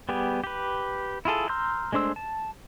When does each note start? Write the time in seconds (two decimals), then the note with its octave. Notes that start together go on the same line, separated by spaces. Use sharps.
0.09 G3 B3 G4 G#4
0.44 G4 B4
1.25 E4 F4 G#4 A4
1.49 A#5 C6 E6 F6 G6
1.93 G#3 A3 D4 C5 E6
2.16 A5